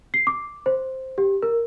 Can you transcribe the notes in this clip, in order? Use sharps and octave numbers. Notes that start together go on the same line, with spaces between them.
C7
D6
C5
G4
A#4